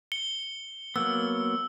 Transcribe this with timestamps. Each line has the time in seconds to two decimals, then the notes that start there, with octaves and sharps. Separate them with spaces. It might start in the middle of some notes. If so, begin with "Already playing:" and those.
0.12 C#7 G7
0.96 F#3 A#3 B3 E6